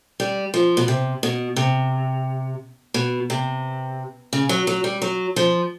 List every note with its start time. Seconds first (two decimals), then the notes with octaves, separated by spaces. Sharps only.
0.20 G3
0.54 F3
0.77 B2
0.88 C3
1.23 B2
1.56 C3
2.94 B2
3.30 C3
4.33 C#3
4.49 F#3
4.67 F#3
4.84 G3
5.02 F#3
5.36 F3